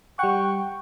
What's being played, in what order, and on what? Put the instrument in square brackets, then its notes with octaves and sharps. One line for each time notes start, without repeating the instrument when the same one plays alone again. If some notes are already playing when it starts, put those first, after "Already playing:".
[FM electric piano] G3 F#5 [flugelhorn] G5 [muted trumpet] C#6